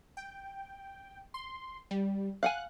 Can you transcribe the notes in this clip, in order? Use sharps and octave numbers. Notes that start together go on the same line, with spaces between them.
G5
C6
G3
F5 F#5 G#5 F#6